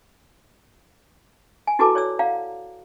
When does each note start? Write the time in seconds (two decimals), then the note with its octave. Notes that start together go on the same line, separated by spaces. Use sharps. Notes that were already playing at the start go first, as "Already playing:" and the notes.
1.67 G#5
1.79 E4 F#4 A4 B4 A5 D6
1.95 C#5 D5 E6
2.19 D5 F5 F#5 A#5